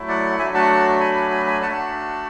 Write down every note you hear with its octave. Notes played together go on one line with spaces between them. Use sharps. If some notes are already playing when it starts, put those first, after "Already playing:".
Already playing: F#3 A3 E4
D5 F#5
F#3 A3 D4 F#4 E5 G#5
F#5 A5
G#5 B5
G#5 B5
G#5 B5
G#5 B5
A3 D4 F#4 F#5 A5